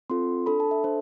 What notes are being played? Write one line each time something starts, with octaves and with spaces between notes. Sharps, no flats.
C4 F4 A4 C6
D4 A4 B5
A5
E5
D4 A4 C5